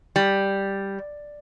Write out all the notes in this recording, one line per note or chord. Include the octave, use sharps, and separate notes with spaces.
G3